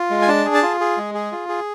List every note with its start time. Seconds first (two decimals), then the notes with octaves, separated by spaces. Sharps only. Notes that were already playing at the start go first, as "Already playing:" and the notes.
Already playing: F4
0.10 G#3
0.22 G#5
0.28 D4 A5
0.45 G#4
0.54 A5
0.63 F4
0.80 G#4
0.97 G#3
1.15 G#4
1.32 F4
1.49 G#4